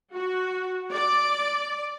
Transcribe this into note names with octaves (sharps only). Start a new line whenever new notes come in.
F#4
D5